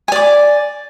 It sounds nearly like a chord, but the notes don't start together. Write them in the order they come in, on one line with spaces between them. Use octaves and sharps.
G#5 D5 D6